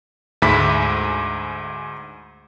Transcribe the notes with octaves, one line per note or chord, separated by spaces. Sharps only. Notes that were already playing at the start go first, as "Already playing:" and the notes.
D2 G#2 E5 B5 D6 B6